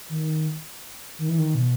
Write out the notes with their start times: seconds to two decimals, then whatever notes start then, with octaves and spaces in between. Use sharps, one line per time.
0.09 D#3
1.19 D#3
1.29 E3
1.38 D#3
1.55 B2